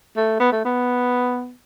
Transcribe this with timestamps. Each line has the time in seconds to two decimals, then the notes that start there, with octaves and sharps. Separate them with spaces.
0.17 A3
0.40 B3
0.52 A3
0.65 B3